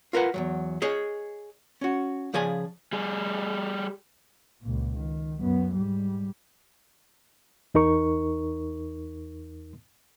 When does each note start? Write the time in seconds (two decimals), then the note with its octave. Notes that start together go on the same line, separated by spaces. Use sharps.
0.13 F4 A#4 B4 F#5
0.34 E2 G2 F#3
0.82 G#4 C#5 D#5
1.81 C#4 F#4
2.33 C#3 F3 G#4 D5 G#5
2.93 G3 G#4
4.62 C#2 A#2
4.98 D#3
5.40 F#2 B3
5.74 G#2 G3
7.74 E2 D#4 A#4 C#6